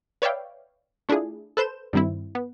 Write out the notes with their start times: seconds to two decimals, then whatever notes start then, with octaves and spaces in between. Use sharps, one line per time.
0.22 B4 C#5 D5 E5 F5 G5
1.09 A3 D4 E4 F4 G#4
1.57 A4 B4 C5 G6 E7
1.93 G2 D#3 G3 C4 E4
2.35 B3